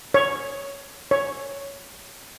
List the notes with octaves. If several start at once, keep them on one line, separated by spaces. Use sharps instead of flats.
C#5
C#5